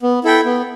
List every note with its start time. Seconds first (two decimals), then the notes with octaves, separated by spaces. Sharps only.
0.02 B3
0.24 E4 A4 E5 G5
0.45 B3